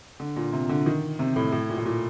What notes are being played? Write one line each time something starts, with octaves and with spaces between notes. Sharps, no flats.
D3
A#2
C3
D3
D#3
C3
A2
A2
A#2
A2
A#2